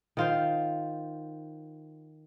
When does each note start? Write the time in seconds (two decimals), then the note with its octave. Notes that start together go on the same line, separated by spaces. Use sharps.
0.17 D#3 F4 C5